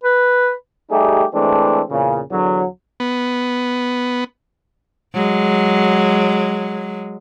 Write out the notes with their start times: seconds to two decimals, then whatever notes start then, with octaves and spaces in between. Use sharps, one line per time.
0.04 B4
0.91 G3 A3 D#4 G4 G#4
1.34 E3 G#3 A3 C4 D4
1.90 E2 A#2 C#3
2.31 E2 D3 F#3
3.00 B3
5.14 F#3 G#3